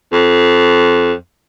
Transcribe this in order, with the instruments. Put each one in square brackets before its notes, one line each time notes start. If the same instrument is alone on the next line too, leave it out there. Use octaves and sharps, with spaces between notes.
[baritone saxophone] F2